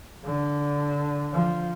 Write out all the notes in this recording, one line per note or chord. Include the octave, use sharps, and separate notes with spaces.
D3
F3